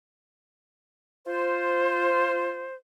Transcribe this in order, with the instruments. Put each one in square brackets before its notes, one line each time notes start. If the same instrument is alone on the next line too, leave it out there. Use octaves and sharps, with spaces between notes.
[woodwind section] F4 C5